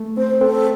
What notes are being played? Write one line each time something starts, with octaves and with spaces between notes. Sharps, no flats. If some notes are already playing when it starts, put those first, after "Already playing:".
Already playing: A3
C4 C5
C4 A4